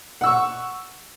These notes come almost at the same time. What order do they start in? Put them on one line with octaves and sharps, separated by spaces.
F#5 E6 C#6